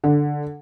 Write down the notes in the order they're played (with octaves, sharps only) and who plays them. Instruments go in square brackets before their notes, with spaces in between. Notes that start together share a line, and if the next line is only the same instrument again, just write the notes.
[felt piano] D3